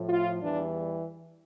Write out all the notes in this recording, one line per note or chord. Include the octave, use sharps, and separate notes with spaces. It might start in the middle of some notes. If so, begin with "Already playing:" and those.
Already playing: A2 F3
F4
E2 E3 G3 D4